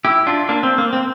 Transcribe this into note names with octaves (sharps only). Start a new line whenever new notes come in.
E4 G4
D4 F4
A#3 D4
C4
A#3
C4